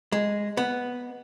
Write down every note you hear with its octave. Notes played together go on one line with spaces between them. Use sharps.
G#3
B3